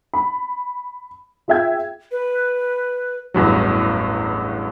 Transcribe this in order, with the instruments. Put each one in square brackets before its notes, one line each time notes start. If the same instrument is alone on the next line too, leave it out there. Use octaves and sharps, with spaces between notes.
[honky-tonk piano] B5
F4 G#4 E5 G5 G#6
[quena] B4
[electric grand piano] A1 E2 G2 F#3